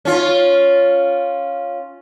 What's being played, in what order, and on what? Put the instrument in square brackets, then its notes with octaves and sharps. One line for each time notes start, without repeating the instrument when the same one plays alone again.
[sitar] C#4 F4